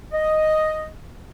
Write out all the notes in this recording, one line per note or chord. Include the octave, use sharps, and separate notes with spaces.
D#5